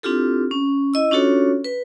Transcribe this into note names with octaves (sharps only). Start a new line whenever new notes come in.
C4 D4 E4 F4 G4 A4
C#4
E4 D#5 E6
C#4 D4 F4 F#4 A4 C#5
B4